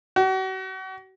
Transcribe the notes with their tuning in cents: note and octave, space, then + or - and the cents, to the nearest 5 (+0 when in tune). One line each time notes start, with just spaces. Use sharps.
F#4 +40